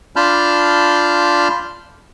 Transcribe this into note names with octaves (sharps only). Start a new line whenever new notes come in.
D4 F4 A5 B5 F6 G6